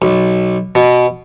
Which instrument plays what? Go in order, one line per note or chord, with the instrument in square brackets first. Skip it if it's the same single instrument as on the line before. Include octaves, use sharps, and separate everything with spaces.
[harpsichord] B1
B2